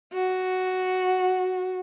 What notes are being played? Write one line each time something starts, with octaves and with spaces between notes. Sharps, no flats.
F#4